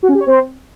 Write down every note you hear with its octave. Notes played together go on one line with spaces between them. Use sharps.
F#4
C#4
G4
C#5
C4